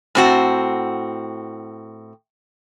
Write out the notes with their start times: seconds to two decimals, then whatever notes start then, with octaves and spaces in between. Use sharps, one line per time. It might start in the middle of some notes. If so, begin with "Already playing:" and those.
0.15 A2 C4 F#4